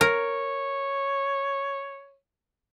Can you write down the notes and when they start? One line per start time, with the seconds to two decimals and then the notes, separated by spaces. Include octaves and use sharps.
0.01 A#4 C#5